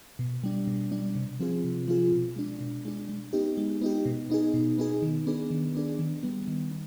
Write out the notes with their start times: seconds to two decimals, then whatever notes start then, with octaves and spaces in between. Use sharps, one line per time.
0.19 B2
0.44 G3 D4
0.67 B2
0.92 G3 D4
1.16 C3
1.40 F3 C4 F4 G#4
1.64 C3
1.88 F3 C4 F4 G#4
2.12 B2
2.36 G#3 D4
2.61 B2
2.85 G#3 D4
3.09 G#3
3.33 B3 D#4 G4
3.57 G#3
3.81 B3 D#4 G4
4.06 B2
4.30 B3 D#4 G#4
4.54 B2
4.78 B3 D#4 G#4
5.02 D#3
5.27 B3 D4 G#4
5.50 D#3
5.75 B3 D4 G#4
5.99 D#3
6.23 G3 B3
6.48 D#3
6.71 B3